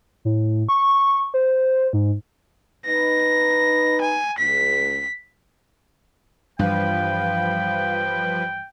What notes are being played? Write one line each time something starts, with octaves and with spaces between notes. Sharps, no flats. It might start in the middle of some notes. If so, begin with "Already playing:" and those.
A2
C#6
C5
G#2
D#4 B4 A#6
G#5
C#2 B6
G2 E3 F3 G3 B4 F5 G5